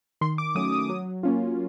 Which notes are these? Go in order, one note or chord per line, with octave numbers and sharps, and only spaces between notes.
D#3 C6
D6
F#3 A3 C#4 D#6
D#6
F#3
A#3 C#4 F4